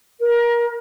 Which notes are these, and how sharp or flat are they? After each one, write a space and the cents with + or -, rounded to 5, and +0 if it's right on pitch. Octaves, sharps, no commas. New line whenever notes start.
A#4 +25